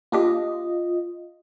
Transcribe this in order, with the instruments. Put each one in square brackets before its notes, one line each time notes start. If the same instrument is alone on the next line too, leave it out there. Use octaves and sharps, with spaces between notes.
[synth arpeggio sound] A#3 D4 G4 [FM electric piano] F4 D#5